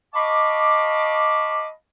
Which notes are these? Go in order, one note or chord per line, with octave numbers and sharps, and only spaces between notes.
D#5 F5 A5 B5 C#6 D6